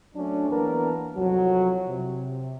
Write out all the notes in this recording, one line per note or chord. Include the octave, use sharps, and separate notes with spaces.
F#3 A3 C#4 D4
E2 A#3 B3 D4 A#4
C2 F2 F#3
C3